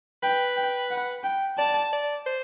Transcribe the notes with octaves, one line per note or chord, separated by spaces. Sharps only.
B4 G5
G5
F#5
G5
D5 A5
D5
C5